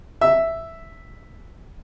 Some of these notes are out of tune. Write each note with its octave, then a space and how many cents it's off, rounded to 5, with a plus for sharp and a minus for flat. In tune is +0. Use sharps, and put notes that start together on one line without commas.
E5 +0 E6 +0